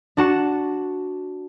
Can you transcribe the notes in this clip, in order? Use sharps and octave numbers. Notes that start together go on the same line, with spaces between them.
D4 F#4 A5 C#7